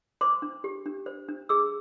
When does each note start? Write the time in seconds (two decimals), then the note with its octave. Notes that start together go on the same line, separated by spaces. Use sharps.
0.21 C5 C6 D6
0.42 D4
0.64 G4
0.86 D4
1.06 C5
1.29 D4
1.49 G#4 D6 E6